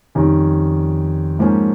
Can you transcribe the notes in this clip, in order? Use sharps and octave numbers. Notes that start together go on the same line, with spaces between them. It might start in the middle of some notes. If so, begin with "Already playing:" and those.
F2 D#3 G3 C#4
G#2 F3 A#3 C#4